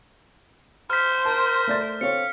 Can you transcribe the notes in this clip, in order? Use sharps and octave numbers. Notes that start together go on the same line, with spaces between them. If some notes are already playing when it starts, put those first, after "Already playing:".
C5 F6 B6
A#4 A5
A3 D5 A6
C4 A4 C#5 F5 C#7